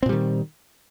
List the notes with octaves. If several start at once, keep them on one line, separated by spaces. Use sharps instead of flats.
A#2 D#3 G3 C4